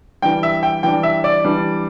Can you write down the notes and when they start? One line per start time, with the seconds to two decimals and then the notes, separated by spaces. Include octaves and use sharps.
0.22 E3 G3 D4 G5
0.43 E5
0.63 G5
0.83 E3 G3 D4 G5
1.03 E5
1.24 D5
1.44 E3 G3 D4